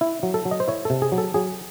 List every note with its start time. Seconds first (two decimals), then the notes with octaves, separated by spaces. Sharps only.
0.01 E4
0.23 F#3
0.34 A4
0.45 F#3
0.51 D#5
0.60 C5
0.68 E4 C#5
0.85 C3 A4
1.02 G#4
1.12 F#3
1.18 A4
1.34 F#3 G#4